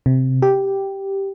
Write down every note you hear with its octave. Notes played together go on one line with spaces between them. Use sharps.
C3
G4